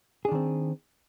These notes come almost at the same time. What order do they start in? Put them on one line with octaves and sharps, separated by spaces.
G#4 D4 D#3 C4